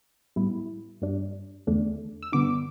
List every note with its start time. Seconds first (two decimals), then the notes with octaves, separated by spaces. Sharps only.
0.36 A2 G3 B3 E4
1.02 G2 G3 D4
1.67 E2 D3 A3 D4
2.22 E6
2.32 G2 D3 B3 D4 D6